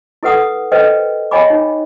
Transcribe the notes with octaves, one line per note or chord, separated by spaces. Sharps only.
E4 A4 B4 F#5 D#6
A4 B4 C5 D#5 G5
C#5 D#5 G5 G#5 B5 D6
D#4